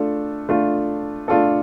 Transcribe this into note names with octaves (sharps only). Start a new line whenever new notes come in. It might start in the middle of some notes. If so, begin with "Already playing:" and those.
Already playing: A3 D4 F4 A4
A3 D4 F4 A4
A3 D4 F4 A4